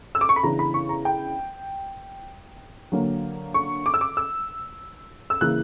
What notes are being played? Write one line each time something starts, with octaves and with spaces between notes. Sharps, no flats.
E6
D6
C#6
B5
C#3 E3 B3 D4 A#5
B5
C#6
A#5
G5
D3 F#3 A#3
C#6
D6
E6
D6
E6
E6
C#3 E3 A#3 F#6